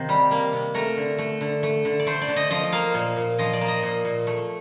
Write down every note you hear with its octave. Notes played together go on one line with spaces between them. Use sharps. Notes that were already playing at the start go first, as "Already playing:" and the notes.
Already playing: C3 D#3 A#3 C5
G3
A#3
C3
A3 A#4
D3
A3
D3
A3
D3
D5
A3 C5
D5
D3
D#5
F3 D#5
A#3 F5
A#2
A#2
F3 D#5
D5
A#3
D#5
A#2
A#2
A3